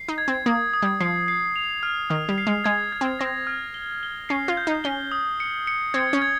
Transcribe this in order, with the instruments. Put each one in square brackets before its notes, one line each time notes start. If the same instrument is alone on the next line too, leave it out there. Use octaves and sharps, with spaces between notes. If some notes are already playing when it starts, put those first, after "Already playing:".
Already playing: [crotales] C7
[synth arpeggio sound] D#4
[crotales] G#6
[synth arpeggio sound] C4
[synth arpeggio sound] A#3 [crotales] D#6
[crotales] D#6
[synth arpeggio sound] G3
[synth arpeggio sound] F3 [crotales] C7
[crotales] C7
F7
F6
[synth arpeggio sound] D#3 [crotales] F6
[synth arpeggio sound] G3
[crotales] C7
[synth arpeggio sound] G#3
[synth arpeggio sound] G#3 [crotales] G#6
[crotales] G#6
[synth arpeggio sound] C4
[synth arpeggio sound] C4 [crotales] A#6
[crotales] F6
G7
G7
[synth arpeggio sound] C#4 [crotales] C7
[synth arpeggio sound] F4
[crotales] G6
[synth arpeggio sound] D#4
[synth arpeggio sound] C#4 [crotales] G7
[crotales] D#6
C#7
C#7
[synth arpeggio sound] C4 [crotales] G#6
[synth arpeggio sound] C#4
[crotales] G#6